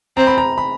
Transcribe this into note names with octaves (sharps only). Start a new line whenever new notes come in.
C4 A#5
B5
A#5
B5